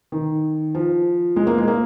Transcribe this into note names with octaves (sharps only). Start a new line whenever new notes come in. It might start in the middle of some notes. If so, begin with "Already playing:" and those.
D#3
F3
G#3
A#3
G#3
A#3